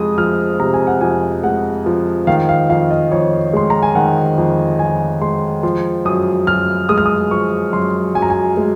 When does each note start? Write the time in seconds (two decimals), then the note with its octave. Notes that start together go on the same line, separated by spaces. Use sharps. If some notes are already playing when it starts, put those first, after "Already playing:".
Already playing: F2 C3 G#3 D#6
0.18 F3 F6
0.60 C3 A#5
0.73 G#5
0.87 F#5
1.01 F2 G#5
1.44 G#3 F#5
1.86 F3
2.27 D#3 F5
2.49 F5
2.70 F2 F5
2.91 D#5
3.11 F2 C#5
3.53 G#3 C6
3.70 A#5
3.83 G#5
3.95 D#3 F#5
4.38 F2
4.79 F2 G#5
5.21 G#3 C6
5.63 F3 C6
6.05 F#2 D#6
6.47 F#2 F6
6.89 G#3 D#6
6.98 F6
7.06 D#6
7.31 F3 C#6
7.73 F#2 C6
8.15 F#2 G#5
8.22 A#5
8.30 G#5
8.57 G#3